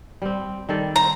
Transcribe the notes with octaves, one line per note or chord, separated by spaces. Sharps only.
G3 C4
D#3 G3 A4
C5 A#5